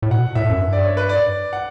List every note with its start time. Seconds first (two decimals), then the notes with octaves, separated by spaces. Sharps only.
0.02 A2
0.11 B2 F#5
0.35 A2 E5
0.50 F#2
0.60 G2
0.73 D5
0.85 C#5
0.97 B4
1.09 D5
1.53 F#5